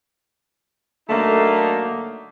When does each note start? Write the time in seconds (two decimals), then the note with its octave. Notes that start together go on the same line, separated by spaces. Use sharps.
1.09 D3 F#3 A3 A#3 D#4